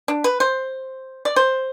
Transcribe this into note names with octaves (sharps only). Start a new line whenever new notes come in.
D4
B4
C5
D5
C5